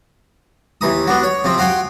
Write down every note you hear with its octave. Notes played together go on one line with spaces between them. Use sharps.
D#2 E3 A#5 D#6
B3 D4 F#4
C#5
C3 F3 C4
F#4 F5 G5 G#5 C6